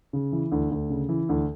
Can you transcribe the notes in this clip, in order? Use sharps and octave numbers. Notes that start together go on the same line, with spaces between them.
C#3
E3
D2
D2
C#3
E3
D2